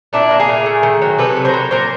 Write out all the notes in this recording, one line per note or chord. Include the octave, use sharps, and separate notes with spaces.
A#2 D4 E4
A#3
G#4 A#4
A#2
A3
D#3
F#3
C3 A4 B4
F#3
A#4 C5
F#3
A#2 A#4 C5